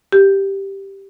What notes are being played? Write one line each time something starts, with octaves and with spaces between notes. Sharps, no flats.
G4